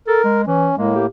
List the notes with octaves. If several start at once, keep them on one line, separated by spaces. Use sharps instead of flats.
A4 A#4
G#3
E3 C#4
A2 G#3 A#3
G4